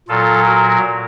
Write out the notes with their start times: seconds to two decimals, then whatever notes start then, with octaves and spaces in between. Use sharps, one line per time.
0.09 A#2 F#3 F4 A4
0.45 F#4 A#4